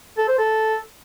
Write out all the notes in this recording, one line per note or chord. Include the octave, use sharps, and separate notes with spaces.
A4
C5
A4